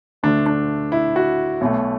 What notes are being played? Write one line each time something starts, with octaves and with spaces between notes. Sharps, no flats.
D2 D3 A3 D4
D4
E4
F#4
B1 B2 A3